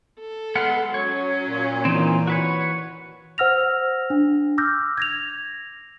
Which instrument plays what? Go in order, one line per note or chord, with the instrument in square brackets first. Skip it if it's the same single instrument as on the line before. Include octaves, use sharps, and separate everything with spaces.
[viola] A4
[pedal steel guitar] G#3 B3 F#5 [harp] F6 C7
[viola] F#3 C#4 [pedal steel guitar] C#5
[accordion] A#2
[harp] E3 [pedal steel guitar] C4 D#4
[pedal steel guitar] F#4 B4 C#5
[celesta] C5 F#5 E6 F6 A#6 F7
D4
D6 E6 F6 G6 A#6
G#6 A#6 F7